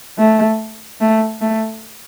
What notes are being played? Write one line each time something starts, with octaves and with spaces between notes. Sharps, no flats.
A3
A3
A3